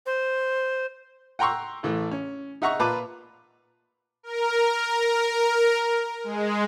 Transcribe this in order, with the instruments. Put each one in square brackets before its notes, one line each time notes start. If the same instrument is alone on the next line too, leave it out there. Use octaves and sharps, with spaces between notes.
[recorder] C5
[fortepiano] F#5 G5 A#5 C6 C#6 E6
A1 E3 A3
C#4
D#4 E5 F#5 A#5 C#6
A#2 F4 B4 A5 D6 F#6
[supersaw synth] A#4
G#3